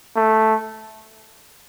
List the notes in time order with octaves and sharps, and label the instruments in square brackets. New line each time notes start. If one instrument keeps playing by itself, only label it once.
[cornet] A3